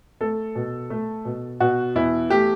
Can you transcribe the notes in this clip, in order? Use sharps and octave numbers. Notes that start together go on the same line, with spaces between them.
A3 A4
B2
A3
B2
B2 F#4
E2 E4
A3 G4